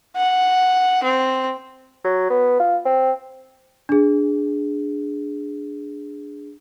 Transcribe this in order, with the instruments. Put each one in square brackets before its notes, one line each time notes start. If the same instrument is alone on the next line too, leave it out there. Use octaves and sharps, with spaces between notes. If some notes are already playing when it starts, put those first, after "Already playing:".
[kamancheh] F#5
C4
[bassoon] F#3
B3
F4
C4
[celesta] D4 G#4